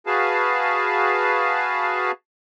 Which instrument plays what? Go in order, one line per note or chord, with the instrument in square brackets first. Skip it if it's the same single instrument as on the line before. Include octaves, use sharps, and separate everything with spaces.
[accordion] F#4 G#4 B4 F5 A5